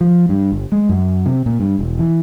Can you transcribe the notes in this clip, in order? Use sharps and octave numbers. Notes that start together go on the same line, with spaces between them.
F3
G2
G1
G#3
F#2
C3
A#2
G2
E1
E3